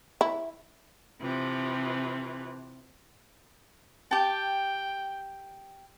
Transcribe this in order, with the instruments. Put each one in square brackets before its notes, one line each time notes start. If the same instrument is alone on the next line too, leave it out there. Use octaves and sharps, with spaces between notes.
[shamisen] E4
[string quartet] C3 E3 F3
[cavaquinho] G4 A5 [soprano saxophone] G5